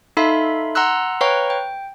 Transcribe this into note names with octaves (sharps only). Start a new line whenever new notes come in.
D#4 A4 E5 F5 B5 C6
F#5 A#5 C6 E6 F#6
B4 C#5 F5 G5 A#5 C#6
G5